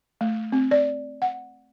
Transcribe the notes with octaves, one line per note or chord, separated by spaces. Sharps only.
A3
C4
D5
F#5